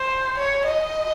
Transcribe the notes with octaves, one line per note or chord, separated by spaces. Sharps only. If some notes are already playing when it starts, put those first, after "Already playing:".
Already playing: C5
C#5
D#5